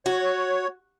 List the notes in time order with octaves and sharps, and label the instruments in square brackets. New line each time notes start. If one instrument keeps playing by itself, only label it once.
[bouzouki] F#4 [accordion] C#5